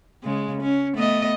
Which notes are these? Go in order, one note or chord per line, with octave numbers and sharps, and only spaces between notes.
C#3 G#3
C#4
A3 B3 D#5